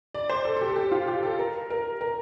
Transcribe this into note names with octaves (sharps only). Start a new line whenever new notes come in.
D5
C5
A4
A4
G4
A4
G4
F4
G4
A4
A#4
A#4
A#4